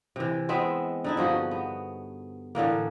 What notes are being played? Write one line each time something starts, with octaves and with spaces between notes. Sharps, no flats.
C3 E3
G#3 B3 C4 E5
D3 D#4 E4
G2 F3 F#4 G#4
B3
A2 D3 E3 A#3